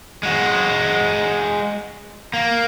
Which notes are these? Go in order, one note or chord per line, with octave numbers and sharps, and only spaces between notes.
G#3 F#4
A#3